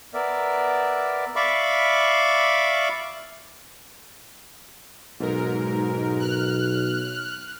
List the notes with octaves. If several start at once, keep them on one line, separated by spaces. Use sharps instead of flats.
B3 A#4 D5 E5
D5 E5 F5 B5 C#6 D6
B1 G#2 A#4
F6 F#6